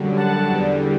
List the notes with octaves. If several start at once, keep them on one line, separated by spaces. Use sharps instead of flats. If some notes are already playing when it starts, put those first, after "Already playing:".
Already playing: F#2 D3 G3
F#5 A5
E2 D3 G3